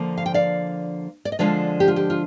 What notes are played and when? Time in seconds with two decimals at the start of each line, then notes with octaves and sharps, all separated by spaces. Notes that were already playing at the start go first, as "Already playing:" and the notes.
Already playing: D3 F3 A#3
0.17 F5
0.26 G5
0.34 D5 F5
1.25 D5
1.32 D#5
1.39 D3 F3 G#3 D4 F4 D5 F5
1.80 G4
1.88 F4
1.96 G4
2.10 F4